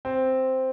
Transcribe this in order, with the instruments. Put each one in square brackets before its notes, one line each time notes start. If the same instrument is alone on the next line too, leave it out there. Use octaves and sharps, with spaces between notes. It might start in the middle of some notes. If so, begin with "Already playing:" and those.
[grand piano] C4